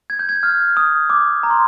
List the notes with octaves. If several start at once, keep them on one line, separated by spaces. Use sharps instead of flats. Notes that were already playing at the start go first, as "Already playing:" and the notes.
G#6
G6
G#6
F6
D#6
D6
A#5
C6